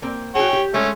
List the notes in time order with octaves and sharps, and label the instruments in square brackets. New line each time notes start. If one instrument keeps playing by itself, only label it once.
[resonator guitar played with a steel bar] A#3 C4
[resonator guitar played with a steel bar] F#4 G#4 [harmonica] C#5 G5
[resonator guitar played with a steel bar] G4
[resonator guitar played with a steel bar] G#3 [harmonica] A3 C#4